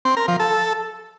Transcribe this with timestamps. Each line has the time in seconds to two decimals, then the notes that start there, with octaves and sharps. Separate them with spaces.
0.05 C4
0.17 A#4
0.28 F3
0.40 A4